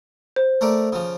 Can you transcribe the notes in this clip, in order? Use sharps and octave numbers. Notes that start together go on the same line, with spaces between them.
C5
A3 A#4 D5
C#3 F3